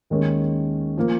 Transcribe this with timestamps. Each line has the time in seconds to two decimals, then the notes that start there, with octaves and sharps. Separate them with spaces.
0.10 D#2 D#3 G#3 C#4
0.97 F3 A#3